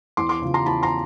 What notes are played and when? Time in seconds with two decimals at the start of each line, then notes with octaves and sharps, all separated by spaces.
0.17 E2 C6 D6
0.29 C6 D6
0.42 C#3 F3
0.54 A#5 C6
0.66 E2 A5 B5
0.83 A#5 C6